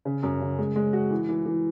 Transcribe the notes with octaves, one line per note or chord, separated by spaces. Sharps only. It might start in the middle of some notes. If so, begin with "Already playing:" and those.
C#3
F#2
C#3
G#3
G#3
F#4
E3
E3
E3